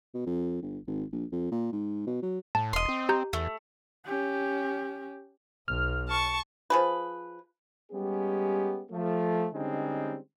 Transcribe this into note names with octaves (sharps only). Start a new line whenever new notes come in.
B2
F2
G1
G#1
A#1
F2
A#2
G#2
B2
F#3
A2 A5
E1 D#5 C6
C4
G4 A#5 G6
E2 A3
C#4 G4
B1 F6
A5 C#6
F3 G#4 B4
G3 G#3 B3 C#4 G4
F3 A3
D3 G3 G#3 C4 C#4 D#4